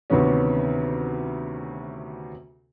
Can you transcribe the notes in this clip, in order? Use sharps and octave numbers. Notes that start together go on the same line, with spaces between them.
D2 C3 D#3 B3 C#4